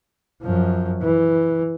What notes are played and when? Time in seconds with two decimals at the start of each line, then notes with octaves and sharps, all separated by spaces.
0.42 F#2 F3
1.02 E3